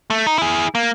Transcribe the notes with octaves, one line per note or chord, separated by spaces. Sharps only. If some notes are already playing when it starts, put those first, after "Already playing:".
A3
D#4
E4 G#4
A#3